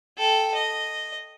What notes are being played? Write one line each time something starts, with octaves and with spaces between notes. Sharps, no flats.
A4 G5
D#5